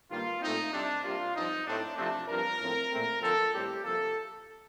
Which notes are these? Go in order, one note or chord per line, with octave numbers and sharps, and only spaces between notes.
G2 D#3 G3 A#3 F4
A#2 A3 C4 D#4
C3 G3 C4 D4
C3 G3 A#3 F4
G2 F3 C4 D#4
A2 A3 C4 D4
C3 F3 A3 C4 D4
G2 F3 C4 A#4
A2 F3 C4
A#2 A3 C4
D3 F3 C4 A4
A2 G3 C4 G4
C3 F3 A#3 A4